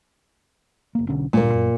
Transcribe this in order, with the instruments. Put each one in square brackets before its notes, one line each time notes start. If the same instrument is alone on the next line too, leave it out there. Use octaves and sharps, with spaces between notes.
[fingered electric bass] F#1 A#3
B1 D3 C#4
[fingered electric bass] D1 G2 [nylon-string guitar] A#2 A#3
[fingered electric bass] F#2